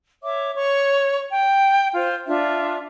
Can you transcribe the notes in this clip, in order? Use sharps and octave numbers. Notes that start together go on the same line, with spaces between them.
C#5 E5 D6
C#5 C#6
G5
F4 C5
D4 F4 E5